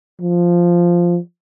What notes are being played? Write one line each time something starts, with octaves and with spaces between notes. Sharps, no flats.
F3